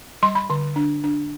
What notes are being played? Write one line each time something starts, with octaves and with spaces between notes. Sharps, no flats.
G3 C6
B5
D3 C6
D4
D4